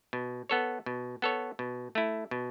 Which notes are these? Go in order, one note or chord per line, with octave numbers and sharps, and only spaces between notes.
B2
B3 A4 C#5
B2
B3 A4 C#5
B2
A3 E4
B2